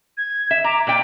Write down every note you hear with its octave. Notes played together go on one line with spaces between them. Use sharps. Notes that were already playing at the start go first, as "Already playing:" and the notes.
G#6
E5 E7
A#5 D6
A#2 D5 G5 D6